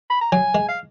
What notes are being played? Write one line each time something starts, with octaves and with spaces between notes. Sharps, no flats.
B5
A#5
F#3 G#5
G#3
F5